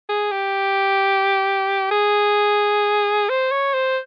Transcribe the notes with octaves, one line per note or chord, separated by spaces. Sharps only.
G#4
G4
G#4
C5
C#5
C5